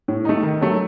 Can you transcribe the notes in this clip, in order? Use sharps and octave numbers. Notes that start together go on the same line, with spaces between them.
A2
A3 D#4
D#3
F#3 A3